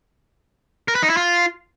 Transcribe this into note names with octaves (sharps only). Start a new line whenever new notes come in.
A#4
B4
D#4
E4
F4